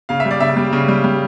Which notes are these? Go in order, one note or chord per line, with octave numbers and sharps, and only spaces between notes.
C#3 F5
E5
G3
D5
C#3 E5
G3
C#3
G3
G3